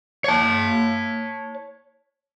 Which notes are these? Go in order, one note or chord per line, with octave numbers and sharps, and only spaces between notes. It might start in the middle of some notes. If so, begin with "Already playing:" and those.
C#5 A5